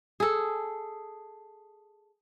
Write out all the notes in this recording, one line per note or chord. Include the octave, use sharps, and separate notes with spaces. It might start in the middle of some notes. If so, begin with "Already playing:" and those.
G#4 A4